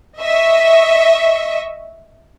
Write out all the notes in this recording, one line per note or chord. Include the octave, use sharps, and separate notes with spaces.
D#5 E5 C#6